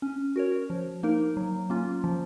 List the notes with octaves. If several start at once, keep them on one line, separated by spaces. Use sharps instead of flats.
C#4
F#4 A#4 C#5
F3
A#3 D#4 A#4
F#3
A#3 C#4 F4
F3